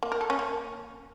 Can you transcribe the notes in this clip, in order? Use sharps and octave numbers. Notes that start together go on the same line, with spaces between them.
A#3
A#4
A4
C#4
A#3